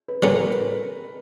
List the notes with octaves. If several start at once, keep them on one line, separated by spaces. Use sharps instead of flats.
B4
D3 G3 A#3 C#4 F4 B4
A#4
B4